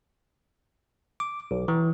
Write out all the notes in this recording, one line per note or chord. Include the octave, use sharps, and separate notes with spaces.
D6
B1
E3